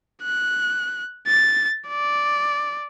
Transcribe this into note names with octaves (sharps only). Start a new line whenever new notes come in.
F#6
A6
D5